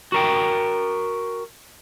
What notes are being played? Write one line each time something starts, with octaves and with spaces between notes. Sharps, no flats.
F#4 A#4 G5